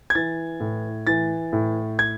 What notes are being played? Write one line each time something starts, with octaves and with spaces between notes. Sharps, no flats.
G#6
E3 A6
A2
E3 A6
A2
G#6